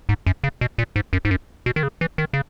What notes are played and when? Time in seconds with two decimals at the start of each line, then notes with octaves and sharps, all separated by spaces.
0.09 G#2
0.26 F#2
0.44 C#3
0.61 B2
0.78 A#2
0.96 G#2
1.13 F#2
1.25 G#2
1.31 F#2
1.66 B2
1.76 D#3
1.83 C#3
2.01 E3
2.18 D#3
2.33 C#3